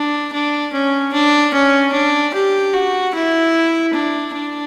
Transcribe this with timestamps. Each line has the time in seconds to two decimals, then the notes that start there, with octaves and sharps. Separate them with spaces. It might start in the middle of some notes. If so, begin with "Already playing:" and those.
Already playing: D4
0.33 D4
0.73 C#4
1.13 D4
1.53 C#4
1.93 D4
2.34 G4
2.73 F#4
3.14 E4
3.93 D4
4.34 D4